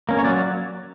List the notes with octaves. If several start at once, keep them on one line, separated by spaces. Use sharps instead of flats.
A#3 C#4
C#5
F#3 D5